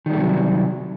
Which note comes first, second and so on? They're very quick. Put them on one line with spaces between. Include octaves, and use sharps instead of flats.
D#3 G3 A3 C3 F#3